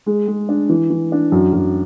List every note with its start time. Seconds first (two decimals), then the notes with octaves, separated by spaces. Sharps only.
0.06 G#3
0.27 G#3
0.49 D4
0.69 E3
0.90 E3
1.12 D4
1.32 F#2
1.53 F#2